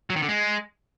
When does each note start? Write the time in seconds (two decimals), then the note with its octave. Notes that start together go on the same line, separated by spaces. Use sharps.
0.10 F#3
0.16 D#3
0.22 D3
0.29 G#3